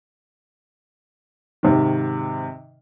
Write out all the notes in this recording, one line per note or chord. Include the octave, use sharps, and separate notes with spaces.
G#2 C3 D#3